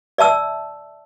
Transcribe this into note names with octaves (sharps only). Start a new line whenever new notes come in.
D5 E5 A5 E6